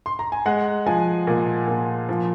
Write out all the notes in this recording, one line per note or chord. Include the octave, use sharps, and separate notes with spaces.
C6
A#5
G#5
G#3 F#5
F3 G#5
A#2
A#2
F3